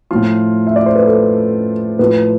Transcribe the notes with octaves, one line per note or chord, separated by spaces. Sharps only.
A2 F3 F4
E5
D5
C5
B4
A4
A2 F3 B4